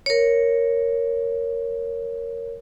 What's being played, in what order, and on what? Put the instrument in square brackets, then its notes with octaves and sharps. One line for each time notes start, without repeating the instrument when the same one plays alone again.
[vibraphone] A#4 C#5